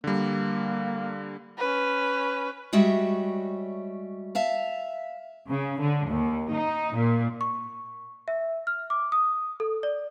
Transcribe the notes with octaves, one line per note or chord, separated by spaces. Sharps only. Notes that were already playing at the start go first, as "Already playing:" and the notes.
D3 G3 A#3
C#4 B4
G3 G#3 F#4 C#5 E5 G5
E5 F5 A5
C#3
D3
D#2
D#4
A#2
C#6
E5
F6
D6
D#6
A4
D5